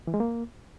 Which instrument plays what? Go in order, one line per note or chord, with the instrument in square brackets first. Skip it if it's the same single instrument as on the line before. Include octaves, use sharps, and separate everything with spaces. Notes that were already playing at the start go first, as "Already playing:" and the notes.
[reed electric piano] E3
G#3
A#3